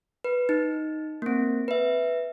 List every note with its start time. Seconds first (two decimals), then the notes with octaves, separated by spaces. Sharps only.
0.24 B4
0.49 D#4
1.22 A#3 C4
1.68 B4 E5